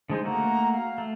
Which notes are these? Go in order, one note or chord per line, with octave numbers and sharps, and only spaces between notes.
D3 G#3 D#4 C5
A3 A#3 F#4 A#5
F5
A3